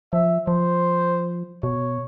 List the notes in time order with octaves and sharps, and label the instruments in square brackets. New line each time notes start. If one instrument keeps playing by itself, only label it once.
[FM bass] F3 [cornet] E5
[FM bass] F3 [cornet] C5
[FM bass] B2 [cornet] C#5